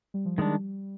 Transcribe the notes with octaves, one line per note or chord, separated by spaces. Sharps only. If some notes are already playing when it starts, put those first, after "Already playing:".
G3
F3
D#3 G3 G#3 D4